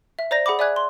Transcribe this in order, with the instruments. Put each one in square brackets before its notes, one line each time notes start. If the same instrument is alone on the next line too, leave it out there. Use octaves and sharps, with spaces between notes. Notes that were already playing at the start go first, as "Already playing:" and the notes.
[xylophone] E5
C5 D5 A#5 G6 A#6
G#4 F#5 B5 D6
D5 E5 G#5 D6 F#6 G#6
C6